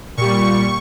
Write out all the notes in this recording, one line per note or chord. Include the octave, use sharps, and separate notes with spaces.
A#2 G3 C#6